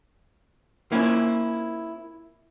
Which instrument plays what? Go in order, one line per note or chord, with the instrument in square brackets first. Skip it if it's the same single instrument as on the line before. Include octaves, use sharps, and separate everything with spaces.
[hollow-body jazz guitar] A#3 C4 C#4 E4 F4